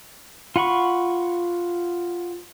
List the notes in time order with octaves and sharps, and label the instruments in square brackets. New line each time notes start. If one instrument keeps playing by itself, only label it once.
[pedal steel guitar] F4 F#5 B5 C#6